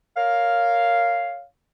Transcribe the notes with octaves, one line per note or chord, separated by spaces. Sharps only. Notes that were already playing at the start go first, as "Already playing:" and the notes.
A#4 C#5 F5